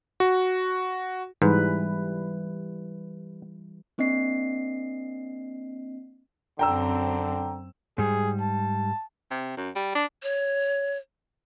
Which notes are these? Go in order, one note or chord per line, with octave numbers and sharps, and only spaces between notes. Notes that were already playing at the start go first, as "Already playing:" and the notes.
F#4
G#2 E3 G3 B4
A#3 C4 D4 D#5 C7
F#2 D3 C4 G5 A#5 E6
G#2 G3 G#4
A5
C3
F#2
G3
D4
C#5